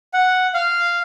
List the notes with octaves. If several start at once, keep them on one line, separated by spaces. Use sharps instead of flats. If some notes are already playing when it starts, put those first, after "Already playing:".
F#5
F5